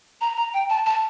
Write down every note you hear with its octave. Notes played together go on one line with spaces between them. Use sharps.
A#5
A#5
G5
A5
A5